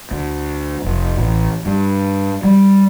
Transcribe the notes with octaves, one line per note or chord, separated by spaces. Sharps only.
D2
F1
A1
G2
G3